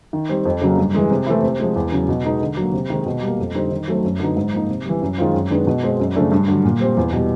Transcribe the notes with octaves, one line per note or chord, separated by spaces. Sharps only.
D#3
G3 C4
F2
C#3 F#3 A#3
G2
E3 G#3
C3
E3 A3 C4 E4
C3
F3 G#3
E2
C#3 F#3
B2
G#3 B3 D#4
D3
F#3 A#3
C3
D#3 G#3 C4 D#4
B2
G3
A#3
F2
D3 G3 C4 D#4
D#3
F#3 A3 C4
F#2
D3 F#3 B3 D#4
G#2
F3 A#3 D#4
C3
E3 G3
F#2
D#3 G#3 C4 F4
F#2
D#3 G#3 B3 D4
B2
G#3 C4
F#2
C#3 F3 A3 D4
G2
D3 F#3
A#2
G3 C4
E2
B2 G3